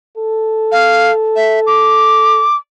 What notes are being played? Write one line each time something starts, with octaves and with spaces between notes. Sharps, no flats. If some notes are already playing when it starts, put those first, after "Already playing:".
A4
F5
E5
D6